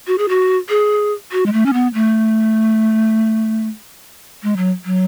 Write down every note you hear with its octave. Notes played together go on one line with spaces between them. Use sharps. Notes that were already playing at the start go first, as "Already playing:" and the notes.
F#4
G#4
F#4
G#4
F#4
G#3
A3
C#4
B3
A3
G#3
F#3
F#3